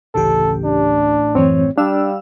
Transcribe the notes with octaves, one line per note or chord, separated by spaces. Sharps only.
A1 D2 C#3 G4 A4
D4
F#2 E3 C4 C#5
G3 D4 F5 E6